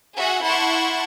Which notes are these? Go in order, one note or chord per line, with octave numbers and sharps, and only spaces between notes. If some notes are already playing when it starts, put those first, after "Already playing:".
F#4 G#4 E5 F#5
E4 F#5 A5 C6 C#6